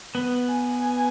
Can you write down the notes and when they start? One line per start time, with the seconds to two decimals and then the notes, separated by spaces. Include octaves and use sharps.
0.15 B3
0.50 G#5